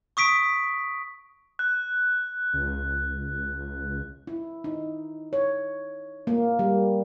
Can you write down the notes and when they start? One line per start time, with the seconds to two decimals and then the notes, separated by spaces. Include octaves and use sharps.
0.17 C#6 D#6 B6 D7
1.59 F#6
2.53 C#2
4.27 E4
4.64 D#4
5.33 C#5
6.27 A#3
6.59 G3